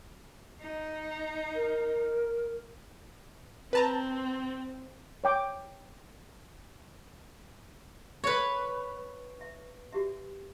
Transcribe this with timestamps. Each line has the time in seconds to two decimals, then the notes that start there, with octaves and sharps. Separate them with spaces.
0.61 D#4
1.55 A#4
3.73 C4 B4 A5 A#5
5.24 C#5 G5 D6
8.24 A4 B4 C#5 E5
9.41 E5
9.93 F#4 G4 E5